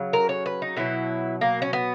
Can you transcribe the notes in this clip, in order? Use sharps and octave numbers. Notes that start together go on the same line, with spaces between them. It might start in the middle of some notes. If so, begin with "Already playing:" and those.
Already playing: C#3 F#3
A#4
C#5
B4
D#4
B2 F#3 E4
A#3
C#4
B3